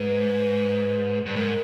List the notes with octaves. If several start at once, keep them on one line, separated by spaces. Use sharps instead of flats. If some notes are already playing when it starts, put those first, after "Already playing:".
Already playing: G#2 B4
G2
G#2 A#4